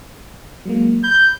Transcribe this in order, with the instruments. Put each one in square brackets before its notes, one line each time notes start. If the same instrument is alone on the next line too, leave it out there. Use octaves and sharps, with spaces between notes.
[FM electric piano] F#3 G#3 A#3
[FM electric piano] B5 [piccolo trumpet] G6